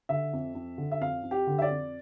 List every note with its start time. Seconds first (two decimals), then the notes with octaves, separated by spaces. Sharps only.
0.09 D3 E5
0.33 F2
0.55 F2
0.78 D3
0.92 E5
1.01 F2 F5
1.23 F2
1.31 G4
1.47 D3
1.58 E5
1.62 D5
1.70 F2